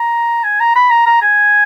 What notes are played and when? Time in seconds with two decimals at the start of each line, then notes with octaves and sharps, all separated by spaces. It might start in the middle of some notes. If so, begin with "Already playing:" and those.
Already playing: A#5
0.44 G#5
0.60 A#5
0.76 B5
0.90 A#5
1.06 A#5
1.22 G#5